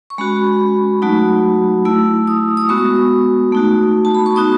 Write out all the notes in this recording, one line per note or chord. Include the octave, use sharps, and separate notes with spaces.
C#6
G#3 C#4 F#4 B5
F#3 A3 D#4 F#4
A3 E4 E6
D#6
D#6
G#3 B3 F#4 C#6
A3 D#4 F#4
A5
B5
C#6
B3 D#4 F#4 D#6